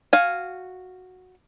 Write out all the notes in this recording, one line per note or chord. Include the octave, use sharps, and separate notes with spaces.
F#4 F5 G#5